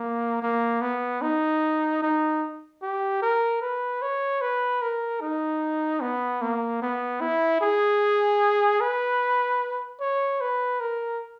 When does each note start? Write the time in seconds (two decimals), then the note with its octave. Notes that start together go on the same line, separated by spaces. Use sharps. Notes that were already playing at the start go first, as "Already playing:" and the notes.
Already playing: A#3
0.42 A#3
0.81 B3
1.22 D#4
2.02 D#4
2.82 G4
3.22 A#4
3.61 B4
4.02 C#5
4.41 B4
4.82 A#4
5.21 D#4
6.01 B3
6.41 A#3
6.82 B3
7.21 E4
7.61 G#4
8.80 B4
10.01 C#5
10.41 B4
10.80 A#4